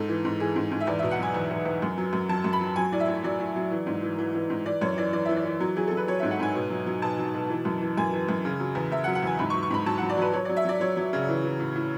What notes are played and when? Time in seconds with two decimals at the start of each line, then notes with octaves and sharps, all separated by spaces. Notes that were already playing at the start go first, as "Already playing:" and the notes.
Already playing: G#2 A4
0.09 E3
0.25 G#2
0.40 E3 G#4
0.56 G#2
0.71 G#2
0.81 E5
0.87 E2 D5
0.99 B2 E5
1.11 F#5
1.19 F#3 G#5
1.34 E2
1.51 E2
1.65 E2
1.82 F#2
1.98 F#3
2.13 F#2
2.29 F#3 A5
2.44 F#2
2.53 B5
2.61 F#3
2.76 F#3 G#5
2.92 A2 D5
3.00 E5
3.08 A2
3.23 F#3 D5
3.40 A2
3.56 F#3
3.71 E3
3.86 G#2
4.03 E3
4.18 E3
4.34 E3
4.50 G#2
4.66 E3 D5
4.81 F#2 C#5
4.97 E3 D5
5.13 E3 D5
5.25 E3 E5
5.37 D5
5.45 E3
5.60 F#3
5.77 F#3 G#4
5.87 F#3 A4
5.97 B4
6.07 F#3 C#5
6.19 G#2 E5
6.31 F#5
6.40 G#2 G#5
6.55 B2
6.70 F#3
6.86 F#3
7.02 B2 A5
7.18 F#3
7.34 B2
7.50 E3
7.65 F#2
7.81 E3
7.97 F#2 G#5
8.12 E3
8.29 F#2
8.45 C#3
8.60 F#3
8.75 E2
8.92 E2 E5
9.04 F#5
9.07 F#3
9.15 F#5
9.22 E2 G#5
9.39 G#2 B5
9.50 C#6
9.54 F#3
9.63 C#6
9.71 G#2 B5
9.86 F#3 A5
9.98 F#3 F#5
10.09 D5
10.17 F#3 B4
10.33 F#3 C#5
10.45 F#3 D5
10.57 E5
10.65 F#3 D5
10.80 F#3 C#5
10.97 F#3
11.13 C#3
11.29 E3
11.44 E3
11.60 A2
11.75 A2